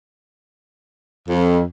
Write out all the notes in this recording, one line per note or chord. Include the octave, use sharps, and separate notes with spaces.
F2